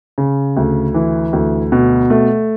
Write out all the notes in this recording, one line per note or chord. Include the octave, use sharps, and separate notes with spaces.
C#3
D2
E3
D2
B2
A3